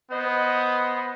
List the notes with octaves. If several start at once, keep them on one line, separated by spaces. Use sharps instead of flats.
B3 C5 D#5